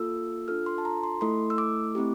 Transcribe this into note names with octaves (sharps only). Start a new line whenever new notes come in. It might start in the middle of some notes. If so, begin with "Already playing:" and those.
Already playing: A#3 F4 A4 E6
D4 F4 A4 F6
C6
A5
A#5
C6
A3 E4 A4 C6
E6
D6
A3 C4 E4 G4